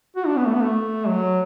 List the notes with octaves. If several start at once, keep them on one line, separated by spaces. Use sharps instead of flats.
F#4
D4
B3
A3
B3
A3
F#3